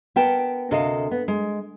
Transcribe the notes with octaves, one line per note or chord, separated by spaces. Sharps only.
B3 A#4 G5 A5
D2 C3 A4 A#4 D#5 F5
B3
G#3